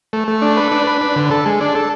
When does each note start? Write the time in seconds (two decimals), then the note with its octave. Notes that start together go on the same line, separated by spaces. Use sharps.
0.13 A3
0.28 A3
0.42 D4
0.57 B4
0.72 D4
0.87 B4
1.01 D4
1.16 D3
1.31 A4
1.46 G#3
1.61 D4
1.75 A4